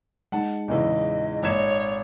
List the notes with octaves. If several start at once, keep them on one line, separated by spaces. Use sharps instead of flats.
G#3 D#4 F#5 A5
E2 A#2 C#3 E3 D#5
G#1 C#5 G#6 E7